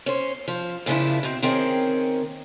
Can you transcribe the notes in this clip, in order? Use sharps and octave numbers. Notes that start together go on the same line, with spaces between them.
C#4 C5
F3
F2 C#3 F3 A#3 D4 E4
B2 C4
D#3 A#3 C4 C#4 G#4 G5